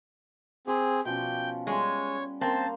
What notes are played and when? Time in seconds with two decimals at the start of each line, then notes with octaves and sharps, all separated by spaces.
0.67 C4 G4 G#4 C5
1.05 B2 F3 C#4 G5
1.67 G3 G#3 C#4 C#5
2.41 A#3 C4 A5